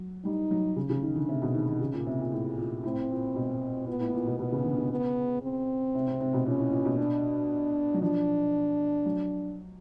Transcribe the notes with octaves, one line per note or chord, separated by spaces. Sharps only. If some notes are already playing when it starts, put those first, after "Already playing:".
Already playing: F#3
G3 D#4
F#3
C#3
C#3
D#3
D3
C3
B2
D#3
D#3
C#3
A#2
C3
A#2
A2
A#2
A2 C4
A#2
B2
A#2 B3
A2
A#2
B2
B2 B3
C#3
D3
C#3
B3
C4
C3
C3
C3
B2
A#2 C#4
A2
A#2
B2
D4
F#3
F3 D4
F#3